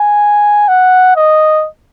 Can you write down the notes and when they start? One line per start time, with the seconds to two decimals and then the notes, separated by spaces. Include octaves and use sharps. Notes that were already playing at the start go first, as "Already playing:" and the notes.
Already playing: G#5
0.68 F#5
1.16 D#5